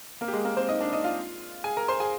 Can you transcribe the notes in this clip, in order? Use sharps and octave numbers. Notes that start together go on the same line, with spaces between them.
A#3 A#4
G4
G#3 G#4
A#3 A#4
C4 C5
D#4 D#5
D4 D5
D#4 D#5
F4 F5
G#4 G#5
A#4 A#5
C5 C6
G#4 G#5